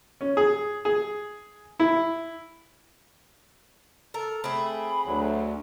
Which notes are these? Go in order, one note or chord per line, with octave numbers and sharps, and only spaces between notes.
C#4
G#4
G#4
E4
A4 A#4
A3 C4 G#4 B5
D2 F#3